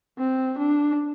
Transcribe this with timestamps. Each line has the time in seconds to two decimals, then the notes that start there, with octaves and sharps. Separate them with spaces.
0.19 C4
0.59 D4